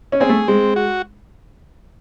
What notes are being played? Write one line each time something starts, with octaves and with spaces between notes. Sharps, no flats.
C#4
C4 G#4
A3
G#3 C4
F#4